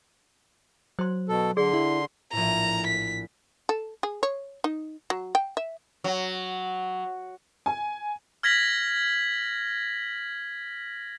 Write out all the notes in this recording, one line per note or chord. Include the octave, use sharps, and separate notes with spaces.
F#3 C5 C6
B2 A4
D3 G#4 D5 C6
E4
A#1 A2 A#5
B6
A4
G#4
C#5
D#4
F#3
G5
E5
F#3
G#5
F6 G#6 A#6 B6 F#7